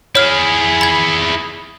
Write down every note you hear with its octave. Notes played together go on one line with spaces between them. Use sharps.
E4 G#4 C#5 F6
B5 G#6